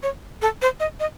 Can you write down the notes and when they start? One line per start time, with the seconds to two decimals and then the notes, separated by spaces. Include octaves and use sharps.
0.03 C#5
0.42 A4
0.62 C5
0.80 D#5
1.00 D#5